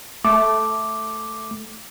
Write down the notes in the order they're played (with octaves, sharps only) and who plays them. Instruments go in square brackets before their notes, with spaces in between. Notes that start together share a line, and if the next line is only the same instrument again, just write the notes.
[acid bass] A3 [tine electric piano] D6